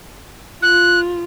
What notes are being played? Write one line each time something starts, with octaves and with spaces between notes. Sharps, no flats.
F4 F#6